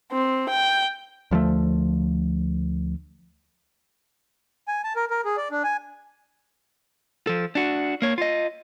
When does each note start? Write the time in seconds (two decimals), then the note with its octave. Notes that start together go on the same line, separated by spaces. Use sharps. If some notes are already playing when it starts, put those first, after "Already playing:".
0.12 C4
0.50 G5
1.31 D2 F3 G3 A3
4.68 G#5
4.84 A5
4.96 A#4
5.10 A#4
5.25 G#4
5.37 D5
5.51 D4
5.64 G#5
7.27 F3 A4
7.55 D4 F#4
8.02 A#3 C#5
8.18 F4 D#5